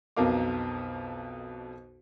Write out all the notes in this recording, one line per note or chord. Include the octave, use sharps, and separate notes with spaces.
B1 F2 B2 A#4 F5 D6